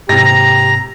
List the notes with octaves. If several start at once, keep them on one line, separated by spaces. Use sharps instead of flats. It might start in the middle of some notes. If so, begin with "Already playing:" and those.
G#2 C3 G4 A#5 A#6